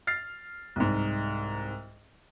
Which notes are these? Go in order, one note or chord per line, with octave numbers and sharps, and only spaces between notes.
F6 A6 C7
C2 G#2